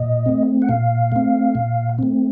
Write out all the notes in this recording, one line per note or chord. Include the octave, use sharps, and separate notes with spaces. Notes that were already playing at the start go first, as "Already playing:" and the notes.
Already playing: A#2 D#5
A3 C4
F#5
A#2 F5
A3 C4
A#2
A3 C4